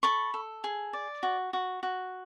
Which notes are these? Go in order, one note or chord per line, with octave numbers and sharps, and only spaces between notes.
A4 B5 C#6
A4
G#4
D5
F#4
F#4
F#4